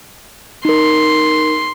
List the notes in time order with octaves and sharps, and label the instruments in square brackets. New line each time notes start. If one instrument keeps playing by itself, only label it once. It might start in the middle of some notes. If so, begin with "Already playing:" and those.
[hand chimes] D#4 A#4 [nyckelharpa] C6